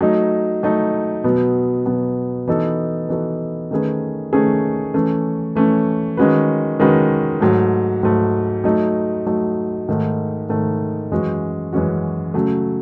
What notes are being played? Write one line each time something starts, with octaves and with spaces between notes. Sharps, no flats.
F#3 A3 D#4
F#3 A3 D#4
B2 F#3 B3
B2 F#3 B3
E3 B3 D#4 F#4 A4
E3 B3 D#4 F#4 A4
D#3 A3 C#4 G#4 B4
D#3 A3 C#4 G#4 B4
E3 A3 C#4
E3 A3 C#4
D#3 G#3 C#4 F#4 B4
D#3 G#3 C#4 F#4 B4
G#2 F#3 A3
G#2 F#3 A3
F#3 A3 D#4
F#3 A3 D#4
G#2 D#3 A3
G#2 D#3 A3
F#2 E3 G#3 C#4 F#4
F#2 E3 G#3 C#4 F#4
C#3 F#3 A3